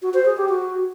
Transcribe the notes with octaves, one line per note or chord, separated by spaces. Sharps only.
F#4
C5
G#4
G4
F#4